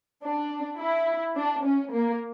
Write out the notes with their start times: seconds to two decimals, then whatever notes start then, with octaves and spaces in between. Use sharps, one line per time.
0.23 D4
0.78 E4
1.36 D4
1.64 C#4
1.92 A#3